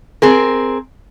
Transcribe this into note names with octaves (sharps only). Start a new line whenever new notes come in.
C4 G#4 A#4